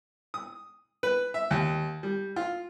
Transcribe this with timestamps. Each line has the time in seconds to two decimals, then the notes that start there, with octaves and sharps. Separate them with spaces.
0.34 D#6
1.03 B4
1.34 E5
1.51 D#2
2.03 G3
2.36 F4